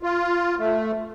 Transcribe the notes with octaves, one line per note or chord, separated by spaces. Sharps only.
F4
A3